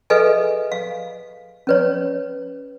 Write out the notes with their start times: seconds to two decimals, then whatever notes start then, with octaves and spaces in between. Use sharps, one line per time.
0.10 G#4 A4 B4 D#5 E5 G#5
0.72 F5
1.67 C#4 B4 C#5